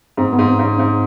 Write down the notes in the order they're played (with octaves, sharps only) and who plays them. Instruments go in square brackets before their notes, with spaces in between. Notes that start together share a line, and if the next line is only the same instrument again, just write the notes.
[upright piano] G#2 [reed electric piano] C4
[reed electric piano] B3
[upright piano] G#2
[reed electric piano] C4
[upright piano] G#2 [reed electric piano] C#4
[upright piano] G#2 [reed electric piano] C4